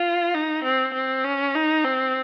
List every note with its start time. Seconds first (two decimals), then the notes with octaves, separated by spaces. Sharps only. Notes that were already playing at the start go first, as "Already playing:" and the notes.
Already playing: F4
0.34 D#4
0.63 C4
0.93 C4
1.24 C#4
1.55 D#4
1.84 C4